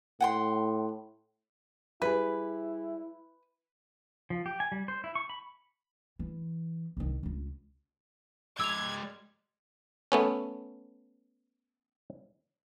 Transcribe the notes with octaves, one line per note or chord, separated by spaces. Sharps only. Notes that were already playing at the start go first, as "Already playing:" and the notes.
A2 F#5 G5 C6
G3 E4 G#4 B4
F3
G4
G#5
G3
C5
E4
C#6
B5
E3
C2 D#3
C#2 F4
G#3 D5 E6 G#6 F7
A3 B3 C#4